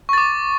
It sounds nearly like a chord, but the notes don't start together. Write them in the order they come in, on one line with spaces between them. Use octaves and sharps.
C#6 A6 D6